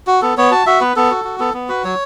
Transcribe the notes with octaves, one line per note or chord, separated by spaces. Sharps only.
F#4
B3 A4
B3 C#5
F#4 A5
F#4 E5
B3 B4
B3 A4
F#4
F#4
B3 A4
B3
F#4 B4
F#3 C#5